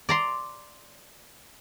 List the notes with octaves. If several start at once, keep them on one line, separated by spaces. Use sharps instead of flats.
D5 A#5 C6